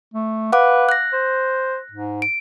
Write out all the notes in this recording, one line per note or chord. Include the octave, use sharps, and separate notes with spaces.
A3
B4 F5 F#5 D6
F#6 A#6
C5
G#2
D7